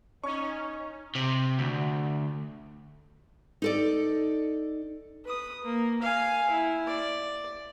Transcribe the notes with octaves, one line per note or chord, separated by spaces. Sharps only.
C#4 D#4 C#6
C3
D2
D#4 A4 D5
B4 D#6
A#3
F5 G#5
E4
D5